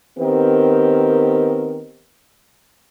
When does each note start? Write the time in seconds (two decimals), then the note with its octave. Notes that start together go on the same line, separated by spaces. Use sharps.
0.19 D#3 B3 C4 G4 A#4